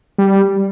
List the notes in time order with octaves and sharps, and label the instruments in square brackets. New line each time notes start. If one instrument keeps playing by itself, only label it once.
[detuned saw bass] G3